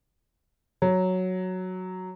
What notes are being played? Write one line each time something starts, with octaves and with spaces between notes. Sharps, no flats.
F#3